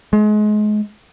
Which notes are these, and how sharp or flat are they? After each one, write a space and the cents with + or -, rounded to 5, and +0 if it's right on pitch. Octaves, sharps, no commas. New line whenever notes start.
G#3 +30